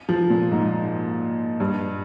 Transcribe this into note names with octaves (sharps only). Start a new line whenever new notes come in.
F3
A#2
G#2
G2